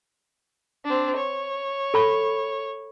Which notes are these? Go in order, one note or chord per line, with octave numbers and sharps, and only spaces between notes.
C4 D4
C#5
A4 B5 C#6